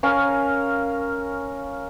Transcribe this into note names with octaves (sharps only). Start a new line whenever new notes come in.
C#4 A#4 F5 G#5